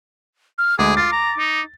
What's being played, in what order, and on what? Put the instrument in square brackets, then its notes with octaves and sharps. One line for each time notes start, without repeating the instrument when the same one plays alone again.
[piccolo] F6
[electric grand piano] D2 G#3 [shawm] G#4 [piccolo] D6
[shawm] F4 [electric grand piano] A6
[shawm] A#5
D#4